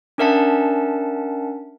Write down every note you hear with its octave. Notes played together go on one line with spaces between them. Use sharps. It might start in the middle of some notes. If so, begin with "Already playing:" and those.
C#4 D4 A#4 E5 F#5 A5